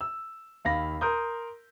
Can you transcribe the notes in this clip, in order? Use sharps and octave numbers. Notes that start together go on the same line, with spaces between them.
E6
D#2 F5 B5 A#6
A#4 C6 D#6 G6